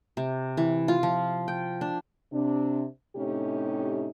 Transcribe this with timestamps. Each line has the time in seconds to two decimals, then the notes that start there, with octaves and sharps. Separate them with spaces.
0.17 C3
0.57 E3
0.88 F4
1.03 F3
1.48 G5
1.81 D4
2.32 C3 D4
3.16 A2 C3 A3 C#4 D#4 G4